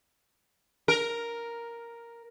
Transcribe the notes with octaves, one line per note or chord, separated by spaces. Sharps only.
A#4